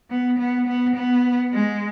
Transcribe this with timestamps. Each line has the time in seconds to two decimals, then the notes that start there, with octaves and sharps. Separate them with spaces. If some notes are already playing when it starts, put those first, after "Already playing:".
0.10 B3
0.38 B3
0.67 B3
0.96 B3
1.53 G#3